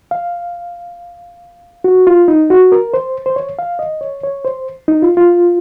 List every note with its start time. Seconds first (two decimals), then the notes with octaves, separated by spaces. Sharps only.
0.11 F5
1.84 F#4
2.07 F4
2.28 D#4
2.50 F#4
2.72 A#4
2.94 C5
3.26 C5
3.36 C#5
3.59 F5
3.79 D#5
4.01 C#5
4.23 C#5
4.45 C5
4.88 D#4
5.02 F4
5.17 F4